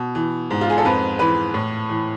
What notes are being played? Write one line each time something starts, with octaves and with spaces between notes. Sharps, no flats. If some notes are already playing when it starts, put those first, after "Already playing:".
Already playing: B2
E3
G#2
F4
G#4
A4
F2 B4
E3 B4
A2
E3